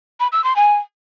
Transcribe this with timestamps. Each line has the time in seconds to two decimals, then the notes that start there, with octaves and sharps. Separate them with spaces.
0.20 B5
0.32 E6
0.44 C6
0.56 G#5